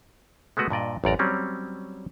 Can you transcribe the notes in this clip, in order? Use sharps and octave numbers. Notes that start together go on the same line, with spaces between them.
G#3 A3 B3 F#4 B4
G2 A#2 D5 D#5
A1 F#2 D5 A#5
F#3 G3 C4 C#4